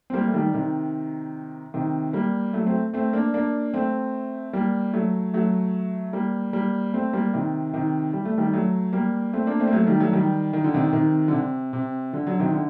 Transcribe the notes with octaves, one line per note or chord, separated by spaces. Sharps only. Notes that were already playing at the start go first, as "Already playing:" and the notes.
C4
G3 A#3
A3
D#3 G3
C3 D#3
C3 D#3
G3 A#3
F#3 A3
A3 C4
A3 C4
A#3 D4
A#3 D4
A3 C4
G3 A#3
F#3 A3
F#3 A3
G3 A#3
G3 A#3
A3 C4
G3 A#3
C3 D#3
C3 D#3
G3
A3
D#3 G3
F#3 A3
G3 A#3
A3 C4
A#3 D4
A3 C4
A#3
F#3 A3
D#3 G3
F#3 A3
D#3 G3
D#3
D3
C3 D#3
C3 D#3
D3
C3
C3
D3
D3 F#3
C3 D#3
D3